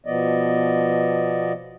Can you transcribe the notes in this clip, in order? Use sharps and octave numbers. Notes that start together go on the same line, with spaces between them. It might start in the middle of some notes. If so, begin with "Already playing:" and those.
B2 F3 B3 D5 D#5